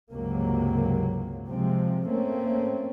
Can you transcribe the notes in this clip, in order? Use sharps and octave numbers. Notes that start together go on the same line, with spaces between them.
C#2 G2 C3 F#3 A#3
C3 F3 G#3 C4
A3 A#3 C4 C#4